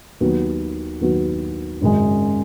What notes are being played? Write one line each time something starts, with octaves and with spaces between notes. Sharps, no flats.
D#2 D#3 F#3 B3 F#4
D#2 D#3 F#3 B3 F#4
G#1 F#2 C#3 G#3